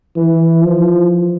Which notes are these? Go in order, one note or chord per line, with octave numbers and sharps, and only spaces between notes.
E3
F3